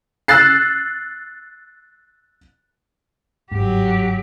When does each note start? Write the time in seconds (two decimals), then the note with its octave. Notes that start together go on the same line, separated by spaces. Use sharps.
0.28 E6 F#6 A6 C7
3.51 G1 G#2 F#3 G4